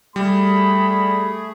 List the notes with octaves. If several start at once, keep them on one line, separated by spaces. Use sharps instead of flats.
G3 A3 G#4 B5